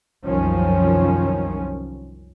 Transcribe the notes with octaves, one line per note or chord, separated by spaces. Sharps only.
C2 F#2 D#3 F3 C#4